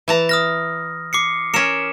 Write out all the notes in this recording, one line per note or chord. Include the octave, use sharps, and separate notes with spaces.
E3 A5 A#5
D#6 F6 A#6
D6 C7 C#7
C#4 A#4 C#7 E7